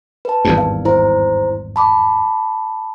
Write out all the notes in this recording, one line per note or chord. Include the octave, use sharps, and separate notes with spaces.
B4 A5
G#1 E2 G2
F5
E4 C5 A#5
A5 B5 D6